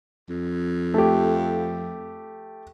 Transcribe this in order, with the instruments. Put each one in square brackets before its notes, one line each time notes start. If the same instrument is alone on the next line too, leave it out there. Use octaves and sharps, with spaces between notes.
[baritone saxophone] F2
[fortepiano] A3 G4